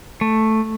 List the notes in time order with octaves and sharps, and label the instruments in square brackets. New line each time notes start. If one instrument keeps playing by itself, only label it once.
[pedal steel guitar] A3